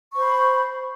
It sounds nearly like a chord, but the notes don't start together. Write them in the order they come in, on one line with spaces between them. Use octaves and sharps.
C#6 C5 B5